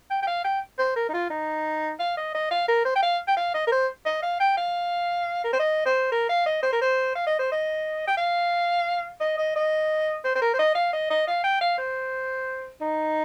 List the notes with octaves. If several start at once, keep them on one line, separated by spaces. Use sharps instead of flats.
G5
G5
F5
G5
C5
A#4
D#4
F4
D#4
F5
D#5
D#5
F5
A#4
C5
G5
F5
G5
F5
D#5
A#4
C5
D#5
F5
G5
F5
A#4
C5
D#5
C5
A#4
F5
D#5
C5
A#4
C5
F5
D#5
C5
D#5
G5
F5
D#5
D#5
D#5
C5
C5
A#4
C5
D#5
F5
D#5
D#5
F5
G5
F5
C5
D#4